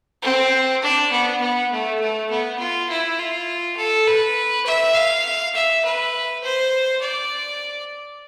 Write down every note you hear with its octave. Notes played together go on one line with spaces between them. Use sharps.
C4
D4
B3
B3
A3
A3
B3
F4
E4
F4
A4
B4
E5
F5
E5
B4
C5
D5